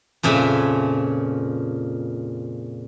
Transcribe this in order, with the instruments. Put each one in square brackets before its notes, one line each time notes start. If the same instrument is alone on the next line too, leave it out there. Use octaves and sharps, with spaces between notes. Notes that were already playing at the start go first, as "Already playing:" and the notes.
[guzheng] F2 A#2 C#3 E5 G#5